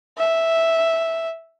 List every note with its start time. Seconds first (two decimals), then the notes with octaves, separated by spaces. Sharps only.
0.18 E5